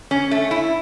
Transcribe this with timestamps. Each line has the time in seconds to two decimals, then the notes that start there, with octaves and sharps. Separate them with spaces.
0.11 C#4
0.31 A3
0.51 E4